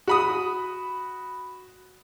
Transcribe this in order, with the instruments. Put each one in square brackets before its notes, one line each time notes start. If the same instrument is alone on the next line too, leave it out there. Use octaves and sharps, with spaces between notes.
[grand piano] F#4 B5 D#6